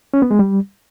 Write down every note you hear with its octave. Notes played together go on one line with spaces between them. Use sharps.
C#4
B3
G#3
G3